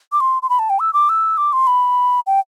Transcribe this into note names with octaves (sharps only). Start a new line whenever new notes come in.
D6
C6
C6
B5
A5
G5
E6
D6
E6
D6
C6
B5
G5